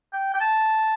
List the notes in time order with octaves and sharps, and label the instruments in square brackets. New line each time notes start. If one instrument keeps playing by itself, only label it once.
[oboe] G5
G5
A5